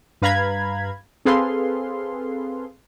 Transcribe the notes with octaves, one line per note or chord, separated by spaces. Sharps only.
G2 B4 F5 A#5 B5 G#6
C4 G#4 A4 B4 F5 C6